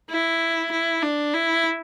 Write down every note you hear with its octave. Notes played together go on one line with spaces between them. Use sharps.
E4
E4
D4
E4